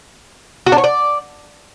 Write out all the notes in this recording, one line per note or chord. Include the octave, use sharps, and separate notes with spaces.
F#4
D4
C#5
D5